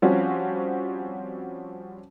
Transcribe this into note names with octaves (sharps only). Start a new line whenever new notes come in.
F3 G3 C4 C#4 F#4